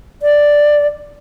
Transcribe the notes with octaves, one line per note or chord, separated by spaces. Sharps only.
D5